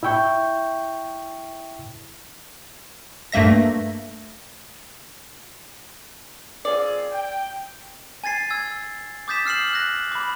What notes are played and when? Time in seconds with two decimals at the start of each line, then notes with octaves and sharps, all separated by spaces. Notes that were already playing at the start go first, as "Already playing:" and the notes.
0.03 E4 E5 G5 C#6 G6
3.32 G2 A3 A#3 E5 A#6
6.65 C4 F4 G#4 D5
7.12 G5
8.24 G#5 G#6 A6 C7
8.50 E6 G#6
9.28 D6 D#6 G6 A6 B6 E7
9.45 E6 F6 C7 E7 F#7
9.73 F#6 A#6
10.12 B5 D6